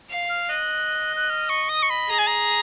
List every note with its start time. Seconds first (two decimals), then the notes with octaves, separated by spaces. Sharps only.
0.10 F5
0.29 F6
0.49 D#5 F#6
1.16 F#6
1.30 F6
1.49 C#6
1.69 D#6
1.83 C#6
1.90 B5
2.09 G#4 A#5
2.19 G#5
2.27 A#5